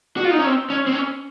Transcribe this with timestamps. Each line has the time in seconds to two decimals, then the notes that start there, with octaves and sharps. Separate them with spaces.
0.17 F#4
0.24 F4
0.31 D#4
0.39 C#4
0.46 C4
0.70 C#4
0.86 C4
0.93 C#4